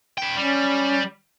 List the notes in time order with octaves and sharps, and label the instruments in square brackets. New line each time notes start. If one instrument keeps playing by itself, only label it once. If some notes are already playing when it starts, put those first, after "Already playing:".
[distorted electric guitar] B4 G5
[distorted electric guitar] G3 [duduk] C#4